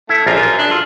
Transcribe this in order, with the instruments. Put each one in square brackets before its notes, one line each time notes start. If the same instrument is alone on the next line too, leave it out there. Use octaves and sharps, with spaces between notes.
[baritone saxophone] A3 [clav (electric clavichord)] E4
[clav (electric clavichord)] A#1 F4 A#4 [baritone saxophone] F#2
[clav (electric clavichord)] F4
[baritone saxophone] D4 [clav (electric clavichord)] G#4 E5
[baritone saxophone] F4 [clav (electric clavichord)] A4